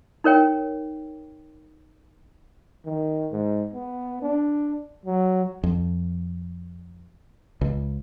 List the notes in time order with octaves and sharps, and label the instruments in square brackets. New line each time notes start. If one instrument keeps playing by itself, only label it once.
[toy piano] D#4 A#4 C#5 G5
[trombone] D#3
G#2
B3
D4
F#3
[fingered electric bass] F2
C#2